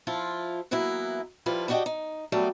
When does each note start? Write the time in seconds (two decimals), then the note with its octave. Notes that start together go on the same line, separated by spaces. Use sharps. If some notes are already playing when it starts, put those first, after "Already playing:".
0.07 F3 E4 F4
0.71 E3 F#3 A#3 B3 E4
1.46 F3 G3 E4 F4 B4
1.68 B3 D4 F#4 G4 D#5 G5
1.86 D#4
2.32 F#3 G3 A3 B3